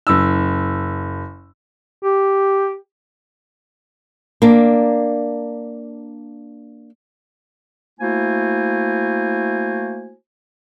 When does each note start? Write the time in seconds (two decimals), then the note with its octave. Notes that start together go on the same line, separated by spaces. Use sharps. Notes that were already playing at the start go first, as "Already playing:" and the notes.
0.07 F#1 E6
2.03 G4
4.42 A#3 D4
8.00 A3 A#3 E4 F#4 C5 G#5